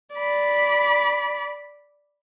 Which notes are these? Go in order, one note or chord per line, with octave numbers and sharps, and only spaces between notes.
D5 B5